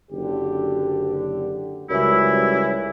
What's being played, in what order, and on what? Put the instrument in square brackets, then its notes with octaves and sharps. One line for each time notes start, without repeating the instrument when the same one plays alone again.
[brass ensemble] F#1 D3 G4
[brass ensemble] C#2 G3 [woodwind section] F#2 E3 E4